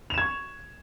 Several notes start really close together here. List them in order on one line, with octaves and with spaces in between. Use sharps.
F7 E7 G#6 C#6